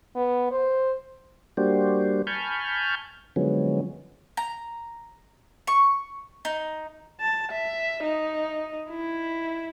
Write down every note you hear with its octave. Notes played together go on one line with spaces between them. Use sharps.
B3
C5
G3 A#3 D4 F#4 G4 C5
G#5 A5 B5 C#6 F6 G6
D3 F3 F#3 G#3 B3 C#4
A#5
C#6
D#4
A5
E5
D#4
E4